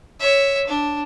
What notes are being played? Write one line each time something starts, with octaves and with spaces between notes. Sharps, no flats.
C#5 E5
D4